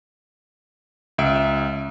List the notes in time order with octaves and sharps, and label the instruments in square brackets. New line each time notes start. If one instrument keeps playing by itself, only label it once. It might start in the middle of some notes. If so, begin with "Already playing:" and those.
[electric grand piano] C#2 E5 D7